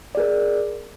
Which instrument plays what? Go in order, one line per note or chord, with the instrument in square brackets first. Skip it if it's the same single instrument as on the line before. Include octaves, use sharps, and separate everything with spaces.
[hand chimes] D5
G#4
A#4